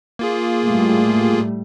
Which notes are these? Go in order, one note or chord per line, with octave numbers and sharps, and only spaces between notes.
A#3 F4 G#4
A2 G3 A3